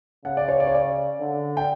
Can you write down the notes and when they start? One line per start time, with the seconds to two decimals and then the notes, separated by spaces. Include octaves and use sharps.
0.25 C#3 F#5
0.37 D5
0.48 C#5
0.60 D5
0.67 C#5
0.75 D5
1.20 D3
1.57 G5